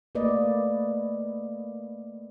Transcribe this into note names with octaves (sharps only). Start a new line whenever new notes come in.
A3 A#3 B4 D5 D#5